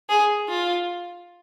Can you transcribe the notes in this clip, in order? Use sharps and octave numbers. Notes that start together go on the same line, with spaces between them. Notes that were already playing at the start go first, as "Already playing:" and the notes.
G#4
F4